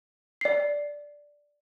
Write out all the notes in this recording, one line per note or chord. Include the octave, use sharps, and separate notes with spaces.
D5 C7